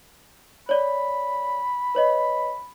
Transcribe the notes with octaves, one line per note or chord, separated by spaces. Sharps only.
C#5 D5 B5
B4 C#5 D#5